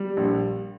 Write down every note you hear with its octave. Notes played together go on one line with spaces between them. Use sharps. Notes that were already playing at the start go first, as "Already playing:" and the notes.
Already playing: G3
A#1